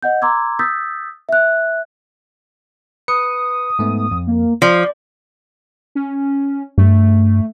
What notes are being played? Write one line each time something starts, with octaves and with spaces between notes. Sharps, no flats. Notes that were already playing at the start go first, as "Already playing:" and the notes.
D#5 F#5 G6
A#5 C6 D6 E6 G#6
D#6 E6 G6 A6 B6
E5 F#6
B4 D#6 C#7
G#2 A3 B3
F2
A#3
F3 D5 C6
C#4
G2 A3